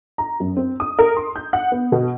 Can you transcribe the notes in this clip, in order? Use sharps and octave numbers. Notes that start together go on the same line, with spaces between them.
A#5
F#2
C4
D#6
A#4
C6
G6
F#5
B3
B2